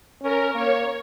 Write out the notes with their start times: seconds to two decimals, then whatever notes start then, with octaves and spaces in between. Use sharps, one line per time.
0.22 C#4 A#4
0.54 A#3 C#5